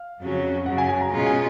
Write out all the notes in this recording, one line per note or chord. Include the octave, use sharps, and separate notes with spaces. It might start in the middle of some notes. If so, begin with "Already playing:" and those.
Already playing: F5
F2 C#3 F#3 C#4
F#2 C#3 F#3 F#5
G#5
G#5
A#5
B2 G#3 C#4 F4 A#5
G#5